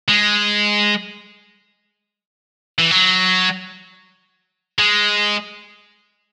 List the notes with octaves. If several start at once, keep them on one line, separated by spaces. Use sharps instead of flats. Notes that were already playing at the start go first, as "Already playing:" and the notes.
G#3
E3
F#3
G#3